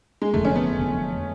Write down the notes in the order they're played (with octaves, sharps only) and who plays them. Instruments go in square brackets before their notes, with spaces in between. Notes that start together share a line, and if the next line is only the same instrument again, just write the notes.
[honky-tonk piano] G#3
[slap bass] F1 F2 D3 F#3 [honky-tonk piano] A3
[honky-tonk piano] C#4
B3
[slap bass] F1 F2 D3 F#3